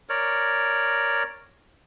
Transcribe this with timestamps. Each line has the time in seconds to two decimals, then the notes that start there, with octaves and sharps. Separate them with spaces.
0.09 A#4 C#5 D5